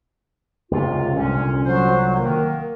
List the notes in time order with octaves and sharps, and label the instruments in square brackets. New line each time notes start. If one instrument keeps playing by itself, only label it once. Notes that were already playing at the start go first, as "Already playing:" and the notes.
[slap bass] C#2 F#2 C3 [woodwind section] F4
[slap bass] C2 A#2 D3 [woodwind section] C#4
[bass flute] F#3 [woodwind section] C5
[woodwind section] D#3 [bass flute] A#3